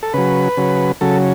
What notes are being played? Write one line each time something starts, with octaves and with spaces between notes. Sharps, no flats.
A4
C#3 F#3 B4
C#3 F#3
C#3 F#3 A4